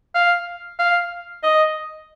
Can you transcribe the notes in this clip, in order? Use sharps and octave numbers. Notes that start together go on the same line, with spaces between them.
F5
F5
D#5